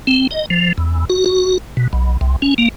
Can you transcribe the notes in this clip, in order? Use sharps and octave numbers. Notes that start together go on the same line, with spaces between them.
C4
D#5
F3
E2
F#4
F#4
B2
B1
C2
C#4
A#3